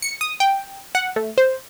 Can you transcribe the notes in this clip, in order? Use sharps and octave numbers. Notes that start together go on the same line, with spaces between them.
C#7
D#6
G5
F#5
A3
C5